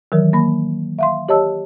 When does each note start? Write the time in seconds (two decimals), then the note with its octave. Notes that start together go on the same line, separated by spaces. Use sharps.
0.12 D#3 E3 F#3 A#4
0.33 A#3 B5
0.99 E5 F5 C6
1.29 G4 C#5 D#5 A5 E6